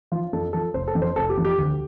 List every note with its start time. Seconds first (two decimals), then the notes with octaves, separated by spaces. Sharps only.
0.12 F3 F4
0.33 F2 A4
0.53 F3 A4
0.74 F1 C5
0.88 A4
0.95 F2 F3
1.02 C5
1.16 F1 A4
1.30 G4
1.37 F2 F3
1.45 G4
1.58 D2